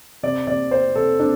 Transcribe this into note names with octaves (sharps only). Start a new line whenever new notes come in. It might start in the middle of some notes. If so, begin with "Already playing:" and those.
C3 D5
C3 D5
C4 C5
C3 A4
C4 D4